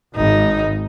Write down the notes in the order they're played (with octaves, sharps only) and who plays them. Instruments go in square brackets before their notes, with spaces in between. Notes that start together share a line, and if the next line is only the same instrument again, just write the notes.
[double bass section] G#1 [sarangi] D#4